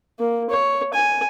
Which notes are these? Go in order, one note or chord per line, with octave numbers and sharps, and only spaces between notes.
A#3
C#5
G#5